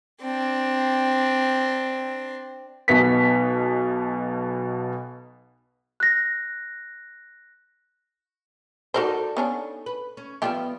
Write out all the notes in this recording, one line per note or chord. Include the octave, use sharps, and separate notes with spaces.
C4 D4
B1 B2 B3 B6
F#6 A#6
D#4 F#4 A4 A#4 C5 D5
B3 C#4 D4
B4
C#4
F3 G3 B3 F4 G4 E5